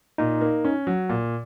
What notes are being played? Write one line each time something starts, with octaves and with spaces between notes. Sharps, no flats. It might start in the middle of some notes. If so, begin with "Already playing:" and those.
A#2 D#4
A#3
C#4
F#3
A#2